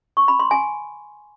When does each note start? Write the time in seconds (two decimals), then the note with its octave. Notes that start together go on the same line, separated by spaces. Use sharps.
0.17 C#6
0.28 B5
0.40 C6
0.51 G#5